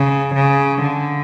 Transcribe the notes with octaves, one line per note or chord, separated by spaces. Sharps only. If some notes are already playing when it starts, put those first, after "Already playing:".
Already playing: C#3
C#3
D3